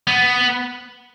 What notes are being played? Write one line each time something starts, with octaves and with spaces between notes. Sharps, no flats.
B3